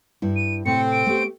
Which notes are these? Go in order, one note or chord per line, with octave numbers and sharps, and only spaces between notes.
G2 E4
D#7
A2 C3 A3 C4 C#7
D7
A3 B3 G4